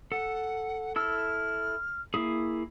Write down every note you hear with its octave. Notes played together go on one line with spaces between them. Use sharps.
A4 F#5
E4 A4 E6 F6
A#3 E4 G#4